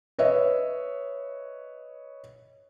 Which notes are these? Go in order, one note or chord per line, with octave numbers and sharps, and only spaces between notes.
B4 C#5 D#5 E5